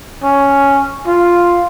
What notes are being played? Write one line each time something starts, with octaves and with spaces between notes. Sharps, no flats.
C#4
F4